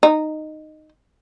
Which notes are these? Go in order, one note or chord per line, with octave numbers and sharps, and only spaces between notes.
D#4